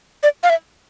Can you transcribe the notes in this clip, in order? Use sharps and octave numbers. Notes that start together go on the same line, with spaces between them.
D5
F5
E5